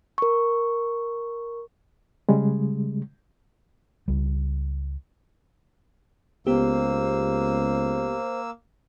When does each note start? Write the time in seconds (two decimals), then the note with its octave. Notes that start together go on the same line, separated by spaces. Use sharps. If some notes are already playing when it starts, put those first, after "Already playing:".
0.18 A#4 C#6
2.29 C#3 G3 G#3
4.08 C#2 G3
6.47 C#2 A#3 B3 G4 C5 E6